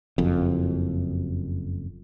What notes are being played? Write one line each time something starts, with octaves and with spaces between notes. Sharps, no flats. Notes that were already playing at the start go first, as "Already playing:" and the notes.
F#1 F2